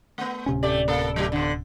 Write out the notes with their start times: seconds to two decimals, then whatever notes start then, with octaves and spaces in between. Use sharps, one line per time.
0.18 A3 B3
0.46 D1 C3 C#4
0.63 A3 G4 D5
0.88 A#3 A4
1.16 F#3 A3 G4
1.32 B2 D3